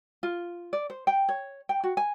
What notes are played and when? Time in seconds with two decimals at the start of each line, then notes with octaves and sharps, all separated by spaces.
0.23 F4
0.73 D5
0.90 C5
1.07 G5
1.29 C#5
1.69 G5
1.83 F#4
1.97 G#5